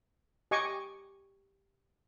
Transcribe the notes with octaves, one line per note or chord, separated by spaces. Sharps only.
G4 D#5 G#5 C#6 D6